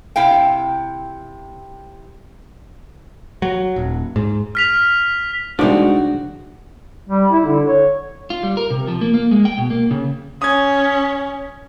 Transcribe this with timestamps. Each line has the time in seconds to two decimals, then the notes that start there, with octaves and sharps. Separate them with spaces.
0.16 C3 E4 F5 G5
3.42 F#3
3.76 D#1
4.16 G#2
4.55 F6 B6 F7
5.59 C2 F3 G#3 D4 D#4 F#4 D5
7.09 G3
7.32 E4
7.46 D3
7.67 C#5
8.30 F4
8.43 G3
8.57 A#4
8.70 C3
8.87 F3
9.01 A#3
9.14 A#3
9.31 G#3
9.45 G5
9.58 B2
9.70 A#3
9.91 C#3
10.42 C#4 D#6 G#6